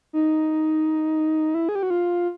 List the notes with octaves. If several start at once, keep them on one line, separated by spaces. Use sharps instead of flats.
D#4
E4
G#4
G4
F#4
F4